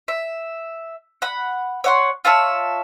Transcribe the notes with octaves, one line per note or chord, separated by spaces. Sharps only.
E5
F#5 B5
C#5 F#5 C6
F4 C#5 E5 A5